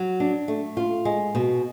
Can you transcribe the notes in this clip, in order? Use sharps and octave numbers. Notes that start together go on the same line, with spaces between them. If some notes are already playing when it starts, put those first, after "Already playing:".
Already playing: F#3
D4
A3
F4
G#3
B2